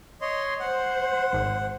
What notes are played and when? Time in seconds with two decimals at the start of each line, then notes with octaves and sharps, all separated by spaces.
0.21 C#5 D#5 C6
0.60 C5 F#5
1.33 G#1